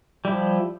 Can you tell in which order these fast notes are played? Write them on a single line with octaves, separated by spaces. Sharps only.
G3 E4 F3